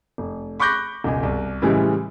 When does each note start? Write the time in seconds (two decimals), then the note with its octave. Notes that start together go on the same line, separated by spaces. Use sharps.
0.18 F1
0.60 B5 C#6 D6 F#6 G6 A#6
1.04 E1 C#2 G#5
1.23 C2
1.62 A2 C#3 E3 G3 G#3